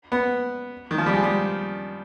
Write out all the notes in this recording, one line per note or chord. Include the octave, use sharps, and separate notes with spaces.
B3
D#3
F3
G3
G#3
G3